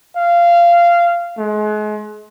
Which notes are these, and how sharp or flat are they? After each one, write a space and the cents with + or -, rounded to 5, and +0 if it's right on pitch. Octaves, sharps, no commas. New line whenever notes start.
F5 -15
G#3 +35